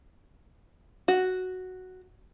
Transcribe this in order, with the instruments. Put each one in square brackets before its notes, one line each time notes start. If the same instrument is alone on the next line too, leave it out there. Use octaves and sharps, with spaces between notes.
[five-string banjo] F#4